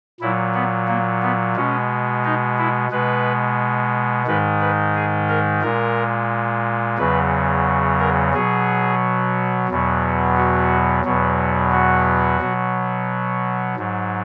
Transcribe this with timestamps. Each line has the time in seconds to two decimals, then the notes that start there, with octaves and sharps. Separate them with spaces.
0.20 A#2 F#3 E4
0.54 B3
0.88 A#3
1.22 B3
1.56 B2 G#3 C#4
2.24 D#4
2.58 E4
2.91 B2 G#3 B4
4.27 G#2 D#3 G#3 B4
4.61 B4
4.95 G#4
5.29 A#4
5.62 A#2 G#3 A#4
6.98 E2 C#3 F#3 B4
8.00 A#4
8.34 B2 F#3 G#4
9.69 E2 B2 F#3
10.37 F#4
11.05 E2 B2 F#3
11.72 F#4
12.41 B2 F#3
13.76 G#2 F#3